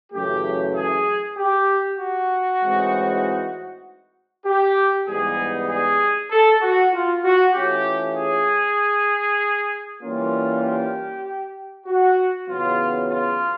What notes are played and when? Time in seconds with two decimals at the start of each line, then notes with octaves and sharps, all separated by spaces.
0.13 F#2 C#3 E3 A3 G4
0.75 G#4
1.37 G4
1.99 F#4
2.60 A2 E3 G#3 C4 D#4
4.46 G4
5.07 G#2 E3 G3 B3 D#4 G#4
5.69 G#4
6.31 A4
6.62 F#4
6.93 F4
7.23 F#4
7.54 E3 A3 C#4 F4 G4
8.16 G#4
10.02 E3 G3 A#3 C#4 F4
10.64 G4
11.87 F#4
12.49 E2 C#3 F#3 B3 F4
13.11 F4